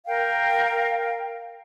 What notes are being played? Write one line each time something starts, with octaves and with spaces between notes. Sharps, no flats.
A#4 F5 G5